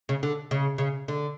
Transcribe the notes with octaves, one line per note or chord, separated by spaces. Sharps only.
C#3
D3
C#3
C#3
D3